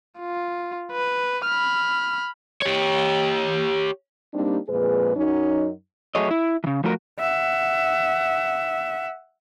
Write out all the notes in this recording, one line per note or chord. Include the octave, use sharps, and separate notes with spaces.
F4
B4
B5 F6
G4 C#5
G3 A#3 C4 D4 D#4 G4
F2 A#2 G#3 G#4 B4
F#2 F#3 C#4 D#4
F#3 A3 G#4 C#5 D#5
E4
C#3 E3
F3 A3 F4 F#4 A#4
E5 F#5